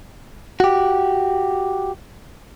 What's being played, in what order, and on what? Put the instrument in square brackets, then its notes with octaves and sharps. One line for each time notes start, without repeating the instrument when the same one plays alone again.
[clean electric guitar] F#4 G4